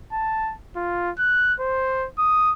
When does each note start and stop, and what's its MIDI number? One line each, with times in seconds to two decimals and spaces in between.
0.12 0.54 81
0.76 1.11 65
1.19 1.54 90
1.60 2.08 72
2.18 2.53 87